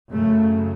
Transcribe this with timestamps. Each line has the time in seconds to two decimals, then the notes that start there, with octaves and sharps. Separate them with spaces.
0.10 F#2 C#3 A3